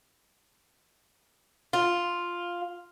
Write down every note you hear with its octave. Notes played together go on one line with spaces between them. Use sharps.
F4